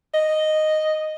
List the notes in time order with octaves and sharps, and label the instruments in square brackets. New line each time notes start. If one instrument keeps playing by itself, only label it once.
[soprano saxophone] D#5